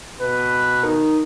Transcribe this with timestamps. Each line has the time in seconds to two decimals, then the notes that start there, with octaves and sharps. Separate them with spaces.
0.21 B2 B4
0.83 D#4 A#4